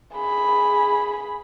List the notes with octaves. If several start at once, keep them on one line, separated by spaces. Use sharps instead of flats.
G#4 B5